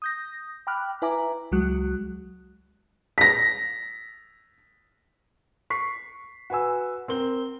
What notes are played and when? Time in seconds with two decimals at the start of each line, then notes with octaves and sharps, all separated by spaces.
0.02 D#6 G6 A#6
0.67 G5 B5 D6 F6 F#6
1.02 E4 B4 E5 G#5 A#5 D6
1.52 C#2 F#3 G#3 F#4 F#6
3.18 A#6 B6
5.70 C#6 B6 C7
6.50 F#4 B4 G#5 E6
7.08 C4 A#4 G7